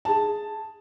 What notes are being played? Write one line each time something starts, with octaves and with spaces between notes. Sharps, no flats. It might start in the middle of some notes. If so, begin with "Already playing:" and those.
G#4 A5